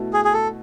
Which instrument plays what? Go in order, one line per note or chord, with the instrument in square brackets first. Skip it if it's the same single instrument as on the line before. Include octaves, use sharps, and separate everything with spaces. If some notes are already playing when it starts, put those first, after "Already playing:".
Already playing: [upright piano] B2 A3 E4
[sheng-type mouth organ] G#4
G#4
A4